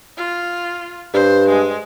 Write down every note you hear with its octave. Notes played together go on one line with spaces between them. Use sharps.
F4
G2 C5
G#3